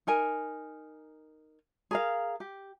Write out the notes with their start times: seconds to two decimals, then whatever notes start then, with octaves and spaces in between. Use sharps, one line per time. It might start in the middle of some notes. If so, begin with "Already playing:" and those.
0.07 D#4 A#4 G#5
1.91 G#4 A#4 F5
2.40 G4